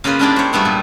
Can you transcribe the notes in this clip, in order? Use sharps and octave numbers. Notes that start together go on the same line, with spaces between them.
C#3 A#3 F4 G#4 B4
G#3 C#4 D4 E4 G4 D5
C5 C#5
G3 A3 B3 E4
A#2